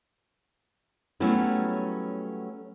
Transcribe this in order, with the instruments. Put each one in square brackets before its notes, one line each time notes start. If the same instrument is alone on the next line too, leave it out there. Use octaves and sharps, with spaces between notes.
[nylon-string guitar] F#3 G3 A3 B3 C#4 E4